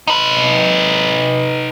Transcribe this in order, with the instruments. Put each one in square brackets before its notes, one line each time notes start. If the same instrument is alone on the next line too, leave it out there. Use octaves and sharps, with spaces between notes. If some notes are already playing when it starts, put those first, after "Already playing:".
[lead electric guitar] D#4 B4